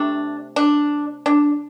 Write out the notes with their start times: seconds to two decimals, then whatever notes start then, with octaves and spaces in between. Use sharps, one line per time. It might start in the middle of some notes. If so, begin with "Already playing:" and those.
Already playing: C3 A3 D4
0.56 D4
1.26 D4